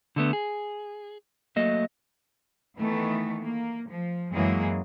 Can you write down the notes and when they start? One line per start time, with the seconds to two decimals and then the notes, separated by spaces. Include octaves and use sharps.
0.16 D3 A3 B3
0.33 G#4
1.56 F#3 A3 A#3 D#5
2.78 D#3 E3 A3 B3
3.43 A#3
3.89 F3
4.33 F#2 E3 F#3 G#3 A#3 G#4